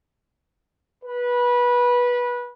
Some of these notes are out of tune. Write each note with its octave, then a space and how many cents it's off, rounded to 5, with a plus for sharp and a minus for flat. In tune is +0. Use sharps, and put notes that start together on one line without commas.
B4 -20